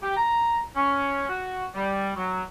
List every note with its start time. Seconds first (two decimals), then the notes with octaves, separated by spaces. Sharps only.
0.03 G4
0.17 A#5
0.75 C#4
1.29 F#4
1.75 G3
2.16 F#3